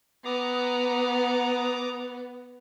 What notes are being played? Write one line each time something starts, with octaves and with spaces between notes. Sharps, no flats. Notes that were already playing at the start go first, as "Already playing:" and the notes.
B3 A#5 D6 D#6